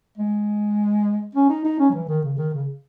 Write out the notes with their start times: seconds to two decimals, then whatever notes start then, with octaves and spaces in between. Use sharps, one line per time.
0.17 G#3
1.35 C#4
1.50 D#4
1.65 D#4
1.79 C#4
1.90 F#3
1.94 E3
2.08 D#3
2.24 C#3
2.38 D#3
2.53 C#3